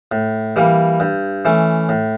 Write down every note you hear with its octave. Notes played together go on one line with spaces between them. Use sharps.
A2
E3 G3 A#3
G2
E3 A3 C#4
A2